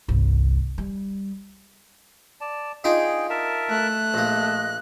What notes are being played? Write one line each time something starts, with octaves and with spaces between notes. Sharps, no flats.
G1 C2
G3
D5 A5
D4 D#4 F4 G#4 G5
A#4 E5 A5
A3 F#6
A#1 A#3 D#5